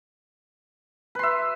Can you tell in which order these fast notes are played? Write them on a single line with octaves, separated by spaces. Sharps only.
B4 C6 E5